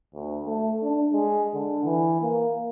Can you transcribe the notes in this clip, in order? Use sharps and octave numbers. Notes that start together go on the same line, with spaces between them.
D2
A3
D4
G#3
D3
E3
A#3